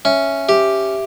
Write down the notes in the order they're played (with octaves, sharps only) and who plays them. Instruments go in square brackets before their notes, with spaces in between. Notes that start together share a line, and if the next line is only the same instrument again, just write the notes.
[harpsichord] C#4 [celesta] E5
[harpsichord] G4 [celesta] E5